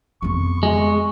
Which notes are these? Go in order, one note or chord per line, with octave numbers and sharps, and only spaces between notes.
F2 B3 C#6
G#3